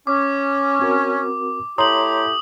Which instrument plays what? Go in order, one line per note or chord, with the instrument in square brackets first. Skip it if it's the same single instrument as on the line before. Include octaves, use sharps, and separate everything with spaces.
[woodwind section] C#4 [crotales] D6
[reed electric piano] C4 F#4 A#4
[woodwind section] A3 E4 G4 [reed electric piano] C#5 A#5 C6 [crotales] D#6 F#7